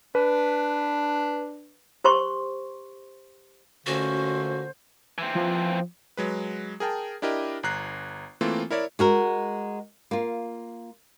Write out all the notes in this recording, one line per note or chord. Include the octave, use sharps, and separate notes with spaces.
D4 B4
G4 C5 C6 C#6
A#2 D3 A3 C#4 F#4 C5
E3 C4
F3
F#3 G#3 B4
G#4 A#4 G5 A5
D4 E4 G4 A#4 D#5
G1 A#5 F#6 C7
E3 A3 A#3 C4 F4
E4 A#4 C#5 D5 E5
G#3 F#4 A#4
A#3 F4